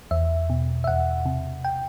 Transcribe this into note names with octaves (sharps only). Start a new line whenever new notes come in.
E2 E5
B2
E5
E2 F#5
C3
G5